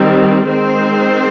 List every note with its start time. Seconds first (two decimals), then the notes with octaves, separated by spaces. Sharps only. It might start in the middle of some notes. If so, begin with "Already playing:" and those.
Already playing: D#3 G3 C4
0.47 D#3 G#3 C4 C5